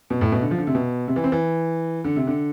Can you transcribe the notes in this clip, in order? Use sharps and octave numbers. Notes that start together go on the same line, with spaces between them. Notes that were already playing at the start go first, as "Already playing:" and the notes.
B2
A2
B2
D3
F3
D3
C3
B2
C3
E3
C4
E3
D3
C3
D3